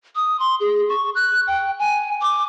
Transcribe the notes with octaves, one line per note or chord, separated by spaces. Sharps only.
D#6
C6
G#4
C#6
F#6
G5
G#5
D6